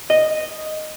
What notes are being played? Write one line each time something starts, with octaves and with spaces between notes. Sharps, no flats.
D#5